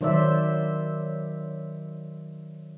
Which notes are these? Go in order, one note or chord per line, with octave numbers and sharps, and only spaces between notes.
D#3 F#3 C5 D5 E5